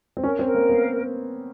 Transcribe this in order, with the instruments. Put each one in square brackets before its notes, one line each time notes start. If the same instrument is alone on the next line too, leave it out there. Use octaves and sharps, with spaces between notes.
[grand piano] C4
[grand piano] C#4 [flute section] A#4
[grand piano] C4
[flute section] A#4
[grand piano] A#3
[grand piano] B3 [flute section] F5